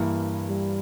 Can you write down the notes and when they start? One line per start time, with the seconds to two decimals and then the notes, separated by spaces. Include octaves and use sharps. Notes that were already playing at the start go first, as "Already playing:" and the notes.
Already playing: G2 E3 A#3 E4
0.48 G3